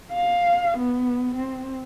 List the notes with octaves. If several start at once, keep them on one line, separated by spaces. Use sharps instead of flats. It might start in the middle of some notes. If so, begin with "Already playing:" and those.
F5
B3
C4